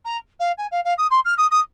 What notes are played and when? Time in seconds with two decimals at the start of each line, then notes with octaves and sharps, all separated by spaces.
0.05 A#5
0.39 F5
0.58 G#5
0.71 F5
0.84 F5
0.98 D#6
1.11 C6
1.25 F6
1.38 D#6
1.51 D#6